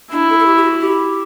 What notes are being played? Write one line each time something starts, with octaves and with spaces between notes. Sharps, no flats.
D4 E4
A4
A4
G4
G4
F#4
G4